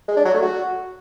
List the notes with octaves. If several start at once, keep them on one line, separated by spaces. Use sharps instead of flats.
G#3
D4
F#3
A3
F#4